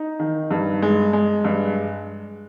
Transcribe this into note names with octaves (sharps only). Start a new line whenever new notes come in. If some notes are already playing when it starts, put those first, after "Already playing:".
Already playing: D#4
D#3
G2
G#3
G#3
G2